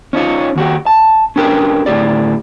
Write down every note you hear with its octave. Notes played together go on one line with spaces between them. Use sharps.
C#4 D#4 F4 C#5
D#2 F#4 G4
A5
C#4 D4 G4 A#4 B4
D2 A2 G4 D5